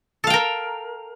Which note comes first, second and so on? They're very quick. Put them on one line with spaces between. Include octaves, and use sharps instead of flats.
A4 F5 G5 A#4